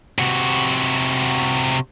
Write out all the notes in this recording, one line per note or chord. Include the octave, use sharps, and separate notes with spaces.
C3 F#4